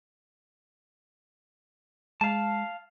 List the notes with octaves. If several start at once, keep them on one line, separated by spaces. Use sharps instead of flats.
G#3 F5 A5